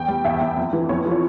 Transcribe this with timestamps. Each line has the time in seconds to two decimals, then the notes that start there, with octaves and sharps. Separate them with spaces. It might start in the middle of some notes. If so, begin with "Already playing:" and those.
Already playing: E2 G5
0.08 G3
0.24 E2 E5 G5
0.41 E2
0.57 F2
0.73 E3
0.89 F2 C#5
1.06 F3
1.11 C#5